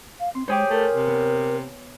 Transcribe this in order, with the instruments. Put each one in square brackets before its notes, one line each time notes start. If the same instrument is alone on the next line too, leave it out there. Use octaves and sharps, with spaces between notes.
[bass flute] F5
[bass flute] C4 [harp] C6
[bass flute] G#3 [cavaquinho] G4 G#4 C5 [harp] C#5 G#5 D6
[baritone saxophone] A3 [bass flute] A#4
[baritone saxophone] C3
[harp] B3